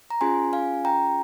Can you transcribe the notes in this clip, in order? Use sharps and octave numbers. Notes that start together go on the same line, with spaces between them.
A#5
C#4 F4 G#4 G#5 C6
F5 G#5
G5 A#5